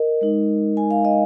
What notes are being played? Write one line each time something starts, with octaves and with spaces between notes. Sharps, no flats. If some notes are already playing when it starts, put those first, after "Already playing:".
Already playing: A#4 D#5
G#3 D#4
G#5
F5
D#5